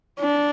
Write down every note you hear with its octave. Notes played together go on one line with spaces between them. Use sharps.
D4